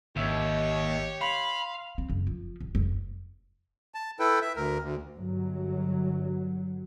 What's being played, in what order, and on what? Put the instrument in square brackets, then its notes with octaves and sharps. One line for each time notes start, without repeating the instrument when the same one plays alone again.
[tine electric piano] G#1 E5 [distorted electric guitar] D#2 [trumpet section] G4 C#5
[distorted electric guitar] F5 [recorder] B5 [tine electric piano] C6
[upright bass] C4
F#1
F3
D#1
F1
[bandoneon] A5
E4 A4 B4 G5
E5
D2 A#4
D2
[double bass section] G1 F#3